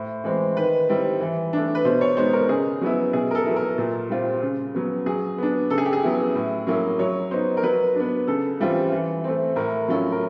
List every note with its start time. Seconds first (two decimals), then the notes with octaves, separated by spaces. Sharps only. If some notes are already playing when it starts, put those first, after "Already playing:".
Already playing: A2 C5
0.24 E3 G#3 C4
0.56 D#3 B4
0.89 G3 C4 E4
1.21 E3
1.53 A3 D4
1.75 B4
1.85 B2 C5
2.01 C#5
2.17 G#3 B3 D#4 C5
2.33 A#4
2.49 C#3 G#4
2.81 F#3 B3 E4
3.13 B2 G#4
3.31 A#4
3.35 A4
3.46 F#3 B3 E4
3.56 A#4
3.78 A#2
4.10 G3 C4 F4
4.42 C#3
4.74 F#3 B3
5.06 F#3 G#4
5.38 B3 D4
5.70 C#3 A4
5.78 G#4
5.85 G4
5.93 G#4
6.03 F#3 B3 E4
6.35 A2
6.67 F#3 A#3 C#4 E4
6.99 F#3 C#5
7.31 B3 D#4 C5
7.57 A#4
7.63 F#3 B4
7.95 B3 D4
8.27 C#3 A4
8.60 E3 G3 C4 F4
8.92 E3
9.24 A3 C4
9.56 A2 A#4
9.88 F#3 A3 C#4 F4
10.12 A#4